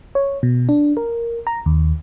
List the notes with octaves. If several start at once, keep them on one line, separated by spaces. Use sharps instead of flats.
C#5
B2
D4
A#4
A#5
D#2